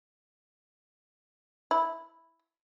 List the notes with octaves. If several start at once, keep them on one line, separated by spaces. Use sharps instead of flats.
E4